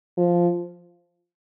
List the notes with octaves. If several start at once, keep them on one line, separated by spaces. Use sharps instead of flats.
F3